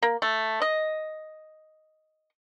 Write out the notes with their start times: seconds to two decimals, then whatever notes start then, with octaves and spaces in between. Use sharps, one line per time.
0.02 A#3
0.22 A3
0.62 D#5